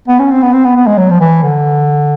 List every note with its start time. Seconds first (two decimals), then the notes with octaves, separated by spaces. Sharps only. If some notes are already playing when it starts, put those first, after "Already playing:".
0.08 B3
0.19 C#4
0.31 C4
0.42 B3
0.53 C4
0.65 B3
0.76 B3
0.87 G#3
0.98 F#3
1.10 F3
1.20 E3
1.43 D3